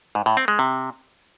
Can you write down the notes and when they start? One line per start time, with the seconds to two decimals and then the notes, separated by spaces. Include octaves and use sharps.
0.15 G#2
0.26 A2
0.37 C4
0.48 G#3
0.59 C3